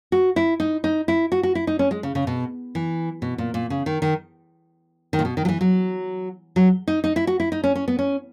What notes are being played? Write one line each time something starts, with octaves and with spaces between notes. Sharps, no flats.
F#4
E4
D#4
D#4
E4
F#4
F#4
E4
D#4
C#4
G#3
C#3
C#3
B2
E3
B2
A#2
A#2
C#3
D#3
D#3
D#3
A#2
B2
D#3
F#3
E3
F#3
F#3
D#4
D#4
E4
F#4
E4
D#4
C#4
C#4
B3
C#4